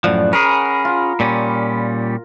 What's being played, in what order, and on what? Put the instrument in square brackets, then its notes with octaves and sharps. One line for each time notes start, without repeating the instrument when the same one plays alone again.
[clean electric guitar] F#2 A2 F3 [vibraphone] D5 [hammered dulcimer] F#5
[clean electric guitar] C#4 G#4 [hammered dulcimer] A#4 [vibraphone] B5
[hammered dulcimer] F4
[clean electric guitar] A#2 G3 C#4